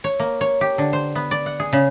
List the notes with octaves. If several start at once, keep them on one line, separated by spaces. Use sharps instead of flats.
C#5
A#3
C#5
G4
D3
C5
B3
D5
F#5
G#4
C#3